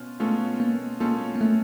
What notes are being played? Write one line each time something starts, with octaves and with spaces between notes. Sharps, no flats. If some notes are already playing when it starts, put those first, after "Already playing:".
Already playing: B2 C#4 F4
B2 G#3 A3 C#4 F4 A4
A#3
B2 G#3 A#3 C#4 F4 A4
A#3
A3